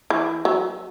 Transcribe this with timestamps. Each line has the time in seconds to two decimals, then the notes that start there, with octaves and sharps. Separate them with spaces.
0.10 E3
0.45 F#3